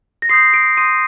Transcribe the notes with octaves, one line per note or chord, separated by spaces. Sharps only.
A#6
C6 D#6 G6 C7
D7
C6 D#6 G6 D#7